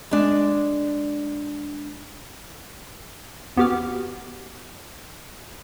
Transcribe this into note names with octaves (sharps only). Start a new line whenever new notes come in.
G#3 D4
E2 B3 F#4 G4 D6 F6